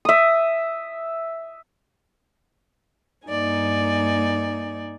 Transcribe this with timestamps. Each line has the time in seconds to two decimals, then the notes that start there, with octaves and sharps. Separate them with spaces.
0.05 E5 D#6
3.28 G2 A#3 D#4 D5 G#5